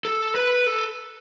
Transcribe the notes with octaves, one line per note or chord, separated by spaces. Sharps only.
A4
B4
A4